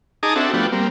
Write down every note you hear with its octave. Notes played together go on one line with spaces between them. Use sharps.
D#4 G#4 A5 A#5 D6 D#6
C4 D4 F#4 A4 E5
F3 A3 B3 D4 F#4 G4
G3 A#3 C4